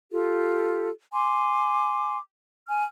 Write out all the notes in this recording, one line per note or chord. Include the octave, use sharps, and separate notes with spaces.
F4 G4 A4
G#5 C6 D6
G#5 F6